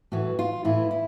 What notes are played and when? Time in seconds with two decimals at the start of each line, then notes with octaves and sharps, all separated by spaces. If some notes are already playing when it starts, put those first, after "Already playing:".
0.12 A2 E3 F#4
0.39 F4
0.64 A2 E3 E4
0.91 E4